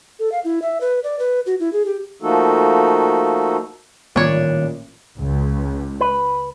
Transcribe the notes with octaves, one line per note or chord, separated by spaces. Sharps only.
A4
F5
E4
E5
B4
D5
B4
F#4
E4
G#4
G4
F3 A3 A#3 D#4 F#4 A4
A1 A#2 D#3 F3 G3 D4 C#5
C#2
B4